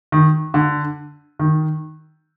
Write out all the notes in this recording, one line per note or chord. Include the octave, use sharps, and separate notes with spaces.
D#3
D3
D#3